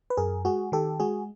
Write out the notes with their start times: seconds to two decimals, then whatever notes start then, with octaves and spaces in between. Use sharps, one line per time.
0.10 B4
0.17 F#2 G#4 A#4
0.45 G#3 F#4 G#4
0.72 D#3 G4 A4
1.00 G#3 F#4 G#4